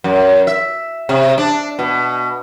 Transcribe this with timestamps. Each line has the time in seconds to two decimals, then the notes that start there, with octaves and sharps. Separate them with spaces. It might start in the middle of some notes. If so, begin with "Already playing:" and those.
0.04 F#2
0.47 E5
1.09 C3
1.38 D4
1.79 B2